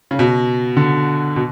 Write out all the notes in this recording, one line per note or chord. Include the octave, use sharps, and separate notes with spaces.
C#3
B2
D3
B2